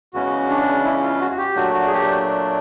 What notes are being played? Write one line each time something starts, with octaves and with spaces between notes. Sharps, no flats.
E2 C#3 E3 G#3 C#4 F#4
D4
E4
F4
F#4
F#4
G4
A#2 F#3 A3 D4 F#4
F#4
G#4
G4